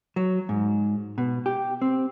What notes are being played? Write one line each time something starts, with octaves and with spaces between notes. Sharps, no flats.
F#3
G#2
B2
G4
C4